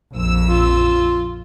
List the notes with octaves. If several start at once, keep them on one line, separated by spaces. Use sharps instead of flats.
A#1 F2 E6
F4